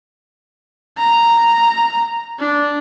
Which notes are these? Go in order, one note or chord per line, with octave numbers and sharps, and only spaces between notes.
A#5
D4